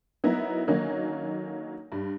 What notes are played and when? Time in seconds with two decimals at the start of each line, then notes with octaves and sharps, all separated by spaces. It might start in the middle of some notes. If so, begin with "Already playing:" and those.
0.24 F#3 B3 D#4 E4 A#4
0.67 D3 D#3 F#3 A#3 C#4 D#4
1.92 G2 G3